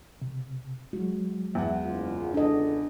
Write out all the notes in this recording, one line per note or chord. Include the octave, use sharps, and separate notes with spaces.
C3
F#3 G#3 F#4
E2 E5 F#5
F#1 F4
C#2 D4 E4 A4 D#5